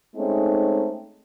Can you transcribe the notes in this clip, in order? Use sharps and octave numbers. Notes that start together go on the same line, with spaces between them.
G#3 A3 C4 C#4 D#4